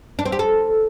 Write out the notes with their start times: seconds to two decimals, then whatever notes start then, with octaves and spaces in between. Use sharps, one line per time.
0.19 D4
0.25 C4
0.32 G4
0.39 A4